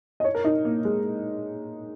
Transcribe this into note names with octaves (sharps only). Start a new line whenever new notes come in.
D#5
C#5
A#4
D#4
A#3
G#3